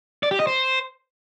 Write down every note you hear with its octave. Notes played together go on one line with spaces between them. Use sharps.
D5
G4
D#5
C5